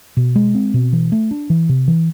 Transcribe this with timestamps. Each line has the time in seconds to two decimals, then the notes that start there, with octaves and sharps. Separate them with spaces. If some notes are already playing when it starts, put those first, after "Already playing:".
0.17 B2
0.36 G#3
0.55 C4
0.74 B2
0.93 E3
1.12 A3
1.31 D4
1.50 E3
1.69 C3
1.88 E3